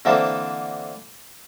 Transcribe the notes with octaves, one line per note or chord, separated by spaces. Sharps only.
D3 E3 A#3 C4 A4 C5